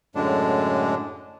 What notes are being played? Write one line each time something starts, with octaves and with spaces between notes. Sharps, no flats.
F#2 A2 D3 G#3 D4